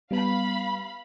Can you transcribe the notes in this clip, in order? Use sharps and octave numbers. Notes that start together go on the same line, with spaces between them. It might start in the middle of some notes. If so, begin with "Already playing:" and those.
G3 B3 F5 B5